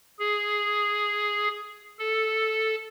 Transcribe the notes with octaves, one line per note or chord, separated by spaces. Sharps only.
G#4
A4